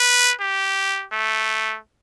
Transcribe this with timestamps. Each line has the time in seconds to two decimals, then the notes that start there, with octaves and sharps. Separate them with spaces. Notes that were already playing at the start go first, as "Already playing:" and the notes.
Already playing: B4
0.41 G4
1.12 A3